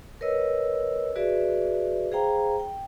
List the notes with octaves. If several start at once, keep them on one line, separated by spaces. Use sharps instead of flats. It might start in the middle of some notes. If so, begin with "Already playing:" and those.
A#4 B4 C#5 D#5 E6
F#4 G#4 B4 D5 E5
G#4 C5 F5 G5 A#5
G5